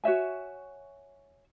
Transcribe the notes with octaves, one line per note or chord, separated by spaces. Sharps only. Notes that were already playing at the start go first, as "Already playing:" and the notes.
F#4 C#5 E5 G#5